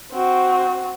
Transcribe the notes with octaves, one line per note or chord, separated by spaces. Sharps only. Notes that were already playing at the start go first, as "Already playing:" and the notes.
C4 F#4